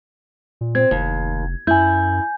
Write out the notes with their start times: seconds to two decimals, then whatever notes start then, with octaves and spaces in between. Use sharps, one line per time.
0.61 A#2
0.75 C4 G#6
0.91 F1 D#2
1.67 F#2 E4 G#5 G6